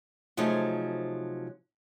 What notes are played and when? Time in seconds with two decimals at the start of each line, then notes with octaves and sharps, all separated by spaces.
0.37 C3 F3 F#3 A3 D#4 G#4